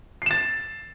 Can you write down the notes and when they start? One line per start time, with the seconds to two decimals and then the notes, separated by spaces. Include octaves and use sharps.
0.22 C7
0.26 E7
0.31 A6